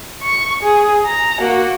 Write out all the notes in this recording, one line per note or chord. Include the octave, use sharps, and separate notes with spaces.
C#6
G#4
A#5
A#3 F#4